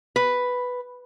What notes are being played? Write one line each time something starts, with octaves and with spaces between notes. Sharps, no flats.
B4